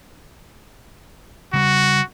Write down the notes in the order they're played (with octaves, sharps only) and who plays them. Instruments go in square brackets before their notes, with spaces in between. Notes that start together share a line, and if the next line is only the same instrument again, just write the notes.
[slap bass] C#3 G3 [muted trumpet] F#4